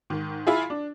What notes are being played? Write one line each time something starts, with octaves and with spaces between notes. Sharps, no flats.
G#2 D#3
E4 F4 G#4
D4